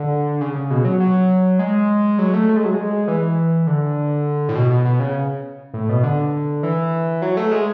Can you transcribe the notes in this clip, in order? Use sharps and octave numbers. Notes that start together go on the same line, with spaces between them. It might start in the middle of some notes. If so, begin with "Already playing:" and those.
Already playing: D3
C#3
C#3
B2
F#3
F#3
G#3
F#3
A3
A3
G#3
F#3
G#3
E3
D3
A2
B2
B2
B2
C#3
A2
B2
D3
E3
F#3
A3
G#3